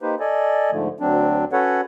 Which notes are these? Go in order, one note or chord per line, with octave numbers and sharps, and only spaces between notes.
A#3 D#4 G4 B4 C5
A4 D5 D#5 G#5
G#2 D3 F3 A3
D2 F#3 C4 D4
C#4 F#4 A4 B4 C#5 F#5